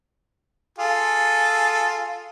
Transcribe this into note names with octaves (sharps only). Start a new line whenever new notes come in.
F4 G#4 A4